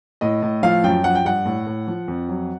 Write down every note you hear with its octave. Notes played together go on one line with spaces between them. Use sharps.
A2 D#5
A2
F3 F5
F#2 G5
F3 F#5
G5
G2 F#5
A2
A2
F3
F2
F#3